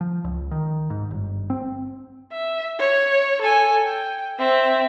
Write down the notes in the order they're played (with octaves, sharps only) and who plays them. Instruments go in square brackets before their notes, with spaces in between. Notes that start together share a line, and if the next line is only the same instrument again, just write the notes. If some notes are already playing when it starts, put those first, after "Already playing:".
[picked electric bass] F3
C#2
D#3
G#2
G1
C4
[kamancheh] E5
C#5
A4 G#5
G5
C4 E5